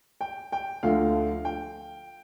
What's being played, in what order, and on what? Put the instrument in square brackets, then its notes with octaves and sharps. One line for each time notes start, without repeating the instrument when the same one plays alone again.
[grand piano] G5
G5
D2 D3 F3 A3 F5
G5